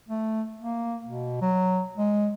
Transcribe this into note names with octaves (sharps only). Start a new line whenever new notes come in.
A3
A#3
B2
F#3
G#3